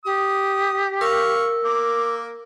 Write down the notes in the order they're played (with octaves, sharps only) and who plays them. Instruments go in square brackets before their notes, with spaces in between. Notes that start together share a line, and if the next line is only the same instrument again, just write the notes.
[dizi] G4 [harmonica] D#6
[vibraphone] A#4 E6 [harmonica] F5 C#6
[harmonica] A#3 [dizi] D6